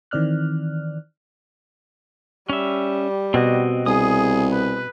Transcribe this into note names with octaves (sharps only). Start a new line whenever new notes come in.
D#3 E3 C4 D5 F6 F#6
G3 C#4 E5
B2 C4 F#4 D#5
C2 G#4 D#6
B4